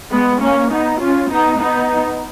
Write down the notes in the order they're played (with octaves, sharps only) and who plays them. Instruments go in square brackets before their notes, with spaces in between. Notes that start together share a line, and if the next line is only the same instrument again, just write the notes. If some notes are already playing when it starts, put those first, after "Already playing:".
[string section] G#3 B3
A#3 C#4
B3 D#4
C#4 F4
B3 D#4
B3 D#4